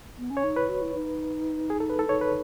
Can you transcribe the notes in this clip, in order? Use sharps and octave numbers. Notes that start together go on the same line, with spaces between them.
B3
C#4
C#5
D#4
E4 B4
F#4
E4
D#4
G#4
A4
B4
A4
D#4 C#5
B4